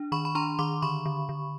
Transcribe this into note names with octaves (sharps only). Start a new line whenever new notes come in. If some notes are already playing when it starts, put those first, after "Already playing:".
Already playing: D4
D#3 B5 C#6
B5
D4 A#5 C6
D#3 C6 D6
D3 B5 C#6
D3
D3